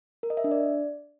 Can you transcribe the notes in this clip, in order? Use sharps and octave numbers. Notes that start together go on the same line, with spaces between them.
A#4
D#5
E5
D4
D5